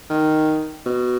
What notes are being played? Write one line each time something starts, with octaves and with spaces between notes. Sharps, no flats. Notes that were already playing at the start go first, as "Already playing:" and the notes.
D#3
B2